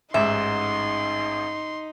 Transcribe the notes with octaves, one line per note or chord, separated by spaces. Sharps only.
A1 G#2 D#4 E5 C6